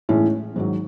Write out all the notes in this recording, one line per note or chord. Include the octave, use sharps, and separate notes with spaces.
A2 E3 G#3 C#4
G#2 D#3 F#3